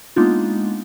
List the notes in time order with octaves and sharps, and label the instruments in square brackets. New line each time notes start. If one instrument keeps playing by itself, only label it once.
[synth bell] G#3 A#3 B3 D4 D#4 F4